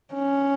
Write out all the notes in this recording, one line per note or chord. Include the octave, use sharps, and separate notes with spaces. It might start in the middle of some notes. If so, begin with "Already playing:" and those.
C#4